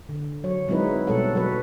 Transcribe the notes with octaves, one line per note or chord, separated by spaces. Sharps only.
D3
F#3 C#5
F#3 G#3 C4 D#4 E4 B4
B2 G3 A4 C#5 F#5
F#3 F#4 B4